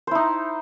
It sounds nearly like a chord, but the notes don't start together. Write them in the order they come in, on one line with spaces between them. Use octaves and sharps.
C5 E4 D#4